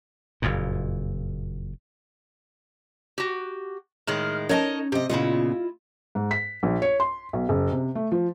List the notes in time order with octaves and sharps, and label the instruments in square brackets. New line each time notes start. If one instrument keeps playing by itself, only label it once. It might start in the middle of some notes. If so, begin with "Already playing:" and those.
[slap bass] F#1 F2 A#2
[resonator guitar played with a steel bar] F#4 G4
[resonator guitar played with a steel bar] A2 D#3 G#3 [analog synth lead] F6
[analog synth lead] C#4 [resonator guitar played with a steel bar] D#4 C#5 [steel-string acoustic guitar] A#4 D#5 A5
[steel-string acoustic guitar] C3 D#5 [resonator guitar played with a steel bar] G4
[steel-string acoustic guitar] A#2 C#3 B3 [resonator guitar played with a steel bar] E4 D#5 [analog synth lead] F4
[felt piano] G#2
B6
A#1
C#5
C6
B1
F#1
C3
A3
F3